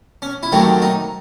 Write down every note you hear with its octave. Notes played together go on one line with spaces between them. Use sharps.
C#4
E4
C3 D#3 F#3 A3 C4 D#4
D#4